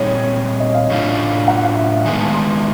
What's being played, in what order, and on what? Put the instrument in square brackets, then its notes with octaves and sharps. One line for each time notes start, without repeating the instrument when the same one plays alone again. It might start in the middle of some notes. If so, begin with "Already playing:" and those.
Already playing: [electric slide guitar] A#2 G3 C4 D#4 G#4 [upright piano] C#5
[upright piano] D#5
F5
[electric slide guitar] A2 F#3 A3 D4 F4
[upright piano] F#5
F5
E5
E5
[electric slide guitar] D#3 G#3 B3 [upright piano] G#5
[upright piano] A5
C6